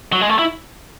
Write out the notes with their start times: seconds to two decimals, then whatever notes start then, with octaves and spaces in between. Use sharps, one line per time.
0.13 F#3
0.21 G#3
0.29 A3
0.39 E4